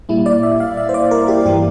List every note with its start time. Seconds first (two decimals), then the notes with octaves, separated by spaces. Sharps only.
0.09 A#2 G3 A#3 E4
0.26 D5
0.43 E5
0.60 F5
0.77 E5
0.89 C5
0.94 D5
1.11 A#4
1.28 G4
1.45 G2 E3 A#3 G4